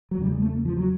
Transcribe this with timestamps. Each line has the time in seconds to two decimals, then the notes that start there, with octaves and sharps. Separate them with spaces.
0.11 F#3
0.18 E2 C#3 G3
0.32 G#3
0.42 A3
0.53 A#3
0.65 F3
0.77 F#3